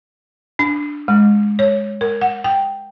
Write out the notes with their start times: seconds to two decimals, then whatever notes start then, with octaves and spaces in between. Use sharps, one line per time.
0.59 D4
1.08 G#3
1.59 C#5
2.01 A#4
2.21 F#5
2.44 G5